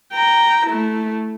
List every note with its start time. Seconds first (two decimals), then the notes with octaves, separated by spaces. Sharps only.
0.13 G5 A#5
0.66 A3 E4